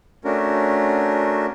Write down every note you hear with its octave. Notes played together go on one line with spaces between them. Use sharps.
A3 C#4 D4 F#4 A#4